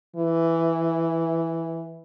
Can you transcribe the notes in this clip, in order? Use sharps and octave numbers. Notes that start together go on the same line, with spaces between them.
E3